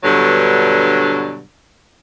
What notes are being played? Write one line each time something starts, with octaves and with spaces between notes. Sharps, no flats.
G2 B2 D3 F#3